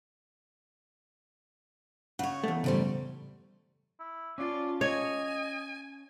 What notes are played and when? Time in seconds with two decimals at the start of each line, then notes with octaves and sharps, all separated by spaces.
2.19 C#3 C#5 F5 F#5
2.44 E2 A3
2.64 F#2 A2 C#3 G3 C5
4.00 E4
4.38 C#4 F4 D5 F5 A5
4.81 C#5 D#5 G#5